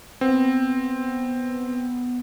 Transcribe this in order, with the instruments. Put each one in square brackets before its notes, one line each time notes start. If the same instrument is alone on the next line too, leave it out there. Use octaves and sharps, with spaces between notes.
[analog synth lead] B3 [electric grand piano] C4